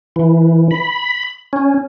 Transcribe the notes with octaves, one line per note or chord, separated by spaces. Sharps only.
E3
B5
C#4